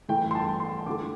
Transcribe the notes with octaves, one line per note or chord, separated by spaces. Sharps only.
A2 E3 A3 G5
C6
A5
C6
D3 A3 D6